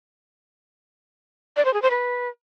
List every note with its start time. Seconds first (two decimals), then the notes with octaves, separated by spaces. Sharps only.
1.57 D5
1.65 C5
1.74 G#4
1.82 C5
1.91 B4